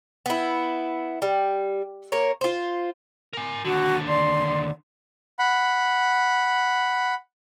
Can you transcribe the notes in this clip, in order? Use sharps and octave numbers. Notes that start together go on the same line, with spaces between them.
B3 E4
G3
A#3 A#4 C#5
F4 C5
A#4 G#5
D#2 D3 F#4
D5 C6
F#5 B5